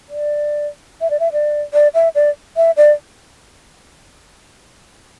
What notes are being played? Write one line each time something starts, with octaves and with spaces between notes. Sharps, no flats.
D5
E5
D5
E5
D5
D5
E5
D5
E5
D5